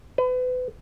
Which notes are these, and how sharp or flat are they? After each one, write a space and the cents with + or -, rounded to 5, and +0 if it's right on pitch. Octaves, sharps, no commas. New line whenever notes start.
B4 +35